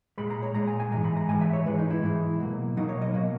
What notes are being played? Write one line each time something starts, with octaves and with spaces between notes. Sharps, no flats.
A#2 G#3 B5
A#5
C#5
A#2 G#3 A#5
G#5
G#5
G#2 E3 G#3 A#5
B5
A#5
G#2 E3 G#3 G#5
E5
C#5
G#2 E3 G#3 B4
D#4
E4
G#2 E3 G#3
B2 F#3 A#3
B2 F#3 A#3 D#4
C#5
D#5
B2 F#3 A#3